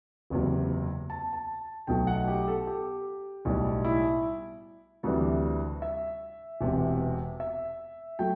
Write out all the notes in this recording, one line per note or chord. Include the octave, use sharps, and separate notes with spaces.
F#1 E2 C3 F#3
A5
A5
B1 B2 F#3 A3 G5
F#5
G4
A4
G4
B1 A2 G3 F#4
E4
D2 C3 E3 G3 F#4
E5
E1 E2 C3
E5
F#3 A3 G5